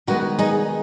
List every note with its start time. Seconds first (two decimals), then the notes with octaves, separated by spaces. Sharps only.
0.07 D#3 G#3 B3 F#4 B4
0.39 D#4 G#4